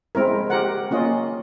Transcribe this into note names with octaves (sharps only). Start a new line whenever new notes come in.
G#3 C4 E4 A#4
G4 A#4 F#5
A#3 C#4 F4 D#5